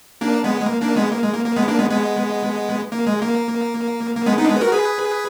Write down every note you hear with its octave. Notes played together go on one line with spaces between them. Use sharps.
A#3 D4
G#3 B3
G#3
A#3
A#3 D4
G#3 B3
A#3
G#3
A#3
A#3
G#3 B3
A#3 D4
G#3 B3
G#3 B3
A#3
G#3
A#3
A#3
G#3 B3
B3 D#4
D4
G#3 B3
B4
F#4 A#4
G#4 B4